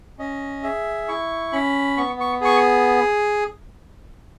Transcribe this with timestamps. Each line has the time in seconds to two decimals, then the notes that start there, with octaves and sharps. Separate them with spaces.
0.19 C#4 D#5
0.63 G#4 E5
1.08 E4 C#6
1.52 C#4 B5
1.97 B3 C#6
2.20 C#6
2.41 G#4 C#6